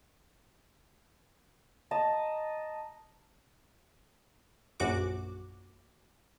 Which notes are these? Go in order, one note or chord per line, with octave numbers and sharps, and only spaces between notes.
D#5 A5 A#5
A#1 F#2 F#4 D6